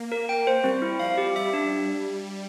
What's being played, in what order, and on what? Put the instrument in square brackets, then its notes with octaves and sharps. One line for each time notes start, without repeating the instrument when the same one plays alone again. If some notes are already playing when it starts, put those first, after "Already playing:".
Already playing: [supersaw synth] A#3
[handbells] A#4
G5
C5
[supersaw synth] G3 [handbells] C4
[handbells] E4
[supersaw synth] F3 [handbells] F5
[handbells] G4
[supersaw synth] G3 [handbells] E5
[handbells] D4